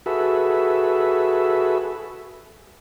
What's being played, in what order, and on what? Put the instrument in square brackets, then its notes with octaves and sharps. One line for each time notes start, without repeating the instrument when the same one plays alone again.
[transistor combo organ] F#4 G#4 A4 B4 E5